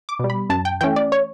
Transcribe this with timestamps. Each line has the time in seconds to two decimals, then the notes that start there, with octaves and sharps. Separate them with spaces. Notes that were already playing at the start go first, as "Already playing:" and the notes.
0.09 D6
0.19 B2 G3
0.30 B5
0.49 F#2 A5
0.65 G5
0.81 E3 A3 C#4 G5
0.96 D5
1.12 C#5